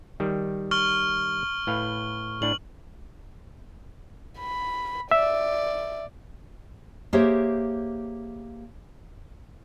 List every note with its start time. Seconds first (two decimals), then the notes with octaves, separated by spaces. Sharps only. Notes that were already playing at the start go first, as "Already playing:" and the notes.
0.20 D#3 G3
0.71 C#6 F6 G7
1.67 A2 B4 F5
2.42 A2 D4 F#7
4.39 B5
5.11 D5 E5
7.13 A#3 G4 G#4 C5 C#5 E5